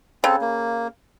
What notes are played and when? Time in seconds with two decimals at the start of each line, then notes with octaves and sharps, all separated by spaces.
0.24 C#3 C4 A4
0.41 A#3